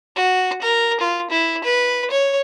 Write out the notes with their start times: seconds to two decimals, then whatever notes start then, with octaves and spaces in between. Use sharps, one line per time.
0.16 F#4
0.62 A#4
1.00 F4
1.31 E4
1.64 B4
2.11 C#5